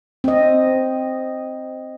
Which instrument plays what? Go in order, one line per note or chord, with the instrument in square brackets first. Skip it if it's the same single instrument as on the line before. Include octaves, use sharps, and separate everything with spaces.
[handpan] C4 D#5